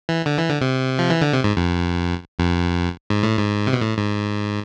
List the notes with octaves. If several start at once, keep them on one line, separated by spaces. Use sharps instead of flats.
E3
D3
E3
D3
C3
F3
E3
D3
C3
G#2
F2
F2
G#2
A2
G#2
C3
B2
A2
G#2